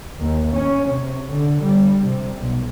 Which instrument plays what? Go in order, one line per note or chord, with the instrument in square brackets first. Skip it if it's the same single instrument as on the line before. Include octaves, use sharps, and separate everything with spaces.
[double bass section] D#2
C#4
C3
D3
G3
C3
B1